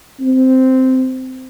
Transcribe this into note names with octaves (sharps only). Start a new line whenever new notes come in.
C4